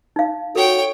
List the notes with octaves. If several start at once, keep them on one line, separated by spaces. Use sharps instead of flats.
D#4 F5
F#4 A4 C#5 G5